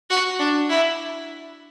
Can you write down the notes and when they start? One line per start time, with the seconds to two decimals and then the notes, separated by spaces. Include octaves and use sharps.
0.10 F#4
0.39 D4
0.69 E4